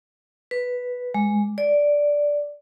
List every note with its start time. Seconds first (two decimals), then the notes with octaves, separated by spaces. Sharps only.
0.51 B4
1.14 G#3
1.58 D5